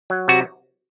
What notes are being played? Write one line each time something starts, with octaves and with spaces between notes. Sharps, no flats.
F#3
C3 F#4